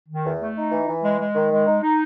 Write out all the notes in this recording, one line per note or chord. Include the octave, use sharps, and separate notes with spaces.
D#3
E2
A3
D#4
E3
E3
G#3
G#3
D#3
G#3
D#4
D#4